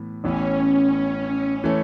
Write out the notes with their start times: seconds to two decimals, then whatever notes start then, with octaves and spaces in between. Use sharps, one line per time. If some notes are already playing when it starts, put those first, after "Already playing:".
Already playing: A2 E3 B3
0.23 A1 A2 E3 B3 C#4
1.64 E3 A3 C#4